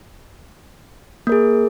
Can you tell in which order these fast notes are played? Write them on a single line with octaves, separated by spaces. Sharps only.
A#3 A#4 G#4